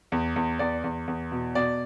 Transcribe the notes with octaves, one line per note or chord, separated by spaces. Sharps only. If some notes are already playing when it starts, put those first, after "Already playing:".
E2
E2
E2 D5
E2
E2
B2
B2 D5